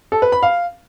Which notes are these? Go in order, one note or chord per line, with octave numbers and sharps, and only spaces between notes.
A4
B4
B5
F5